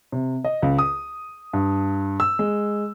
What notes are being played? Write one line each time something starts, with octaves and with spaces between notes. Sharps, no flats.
C3
D#5
C#2
D#6
G2
E6
G#3